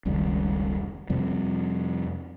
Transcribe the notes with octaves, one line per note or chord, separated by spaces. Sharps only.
F1 C#2 D#3 G3
F2 C3 G3